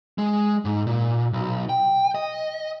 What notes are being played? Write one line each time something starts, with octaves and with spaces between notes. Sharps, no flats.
G#3
G#2
A#2
B1
G5
D#5